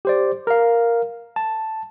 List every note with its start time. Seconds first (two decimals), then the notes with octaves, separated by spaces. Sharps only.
0.05 G4 C5 D5
0.47 A#4 F5
1.36 A5